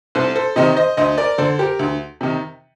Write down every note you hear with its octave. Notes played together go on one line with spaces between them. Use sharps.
C2 A4 C5
A4 C5
C3 D#3 C5 D#5
C5 D#5
D2 C5 D#5
A#4 D5
D3 A4 C5
G4 A#4
D2
C3 D#3